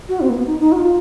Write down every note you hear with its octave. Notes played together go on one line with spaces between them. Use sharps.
F#4
C4
A#3
B3
D#4
D#4
F#4
F4